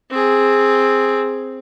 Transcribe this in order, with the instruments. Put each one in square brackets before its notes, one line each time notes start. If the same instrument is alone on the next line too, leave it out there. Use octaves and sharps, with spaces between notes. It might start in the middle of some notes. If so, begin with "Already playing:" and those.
[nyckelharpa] C4 G#4